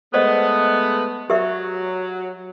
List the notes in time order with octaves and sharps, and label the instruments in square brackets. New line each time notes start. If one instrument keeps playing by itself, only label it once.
[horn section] G#3 A3 B3 [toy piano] C5 D5 D#5
[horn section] F#3 [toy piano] G4 D5 E5